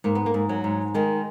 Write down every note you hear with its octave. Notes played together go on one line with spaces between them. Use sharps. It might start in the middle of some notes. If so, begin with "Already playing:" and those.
G#2 A#3
B3
A#3
G#2
F#3
G#2
D#3 G#3